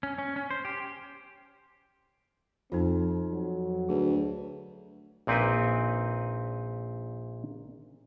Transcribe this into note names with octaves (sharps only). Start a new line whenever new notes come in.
C#4
C#4
C#4
C5
G4
F2 C4 D#4 F4
F#3
D2 G#4 B4
A#1 A#2 C4 D#4 B4 G#5